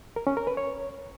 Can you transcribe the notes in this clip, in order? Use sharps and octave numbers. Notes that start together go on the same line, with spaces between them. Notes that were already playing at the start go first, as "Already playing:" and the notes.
A#4
C#4
A#4
B4
C#5